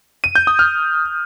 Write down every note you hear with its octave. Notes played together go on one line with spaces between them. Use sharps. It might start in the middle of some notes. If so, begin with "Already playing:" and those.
D#7
G6
D#6
F6